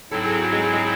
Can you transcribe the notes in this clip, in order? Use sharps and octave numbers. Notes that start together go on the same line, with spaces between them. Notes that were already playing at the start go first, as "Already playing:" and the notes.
G#2 F#3 C4 E4 A4
G#4
F#4
G#3 G#4
G#3 G#4